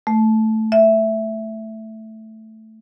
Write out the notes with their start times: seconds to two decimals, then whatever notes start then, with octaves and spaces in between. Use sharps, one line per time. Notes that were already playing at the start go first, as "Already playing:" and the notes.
0.07 A3
0.72 E5